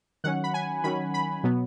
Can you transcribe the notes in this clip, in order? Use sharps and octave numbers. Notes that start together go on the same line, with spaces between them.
D#3 F#3 C#4 F#5
B5
G#5
D#3 F#3 C#4 B5
B5
B2 F#3 B3